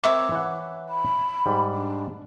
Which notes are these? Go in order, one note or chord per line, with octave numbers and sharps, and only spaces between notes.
C4 A#4 C#5 E5 D6
E3 F#5
B5
G#2 G3
D4